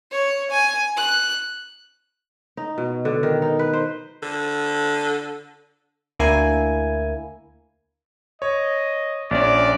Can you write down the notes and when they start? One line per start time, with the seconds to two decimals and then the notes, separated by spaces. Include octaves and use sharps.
0.12 C#5
0.51 G#5
0.97 F#6
2.57 D#4
2.78 B2
3.05 D3
3.23 D#3
3.42 D#4
3.59 B4
3.73 C5
4.23 D3
6.19 D2 A#3 E4 G#5
8.42 C#5 D#5
9.31 A#1 C#4 D5